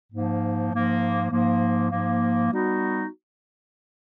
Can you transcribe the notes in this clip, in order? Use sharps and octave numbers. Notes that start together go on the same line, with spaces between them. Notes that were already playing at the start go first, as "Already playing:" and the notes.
G#2 F3 A#3
G#2 F3 A#3
G#2 F3 A#3
G#2 F3 A#3
G3 B3 D#4 F#4